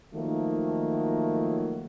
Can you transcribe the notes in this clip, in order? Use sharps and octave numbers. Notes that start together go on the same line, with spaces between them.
D#3 F3 F#3 A3 A#3